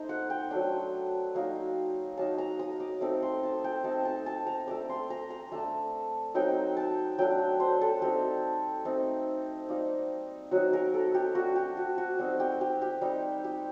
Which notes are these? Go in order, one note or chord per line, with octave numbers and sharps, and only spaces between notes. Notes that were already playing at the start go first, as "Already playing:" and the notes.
Already playing: A3 D#4 C5
F#5
G5
F#3 A3 D4
F#3 A#3 D#4
F#3 A#3 D#4 A5
A#5
D#6
D6
A3 C4 D#4 D6
C6
A5
G5
A3 C4 D#4 A5
A5
A5
A#5
A3 D4 D6
C6
A#5
A#5
A3 D4 A5
F#3 C4 D#4 G5
A5
F#3 A3 D4 G5
C5
A4
G3 C4 D#4 G4
A3 C4 D#4
G3 A#3 D#4
F#3 C4 D#4 F#4
A#4
A4
G4
A3 D4 F#4
G4
F#4
F#4
G3 C4 D#4 F#4
G4
G4
G4
G3 C4 D#4
G4